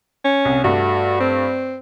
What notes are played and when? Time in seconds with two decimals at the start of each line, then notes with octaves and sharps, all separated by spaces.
0.24 C#4
0.45 C2
0.64 G2 A3 F#4
1.20 C4